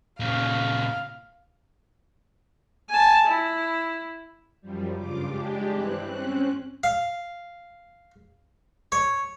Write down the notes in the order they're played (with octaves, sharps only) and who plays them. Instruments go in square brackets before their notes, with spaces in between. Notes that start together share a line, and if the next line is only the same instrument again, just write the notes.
[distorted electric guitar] A#2 C#3 [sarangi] F5
[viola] G#5 A5
E4
[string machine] F#2 F3 G3
G2 C#3 F4 D6
G#3 D4 G4
G2 E3 C4 F#6
C4 C#4 F#6
[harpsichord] F5
C#5